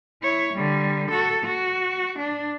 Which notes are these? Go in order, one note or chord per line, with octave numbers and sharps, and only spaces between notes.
E4 C#5
D3 G3
F#4 A4
F#4
D4